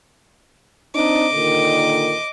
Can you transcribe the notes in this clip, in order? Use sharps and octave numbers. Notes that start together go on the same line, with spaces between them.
C4 D4 D#4 D#5 D6
A#2 D3 D#3